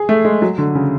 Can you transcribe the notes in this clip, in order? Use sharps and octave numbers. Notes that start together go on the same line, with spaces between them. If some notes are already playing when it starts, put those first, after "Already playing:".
Already playing: G#4
A3
G#3
F#3
D3
C#3